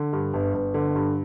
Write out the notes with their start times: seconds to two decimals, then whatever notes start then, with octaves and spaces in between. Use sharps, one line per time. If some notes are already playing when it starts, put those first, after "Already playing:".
Already playing: D3
0.13 G2
0.34 G1
0.54 G1
0.74 D3
0.95 G2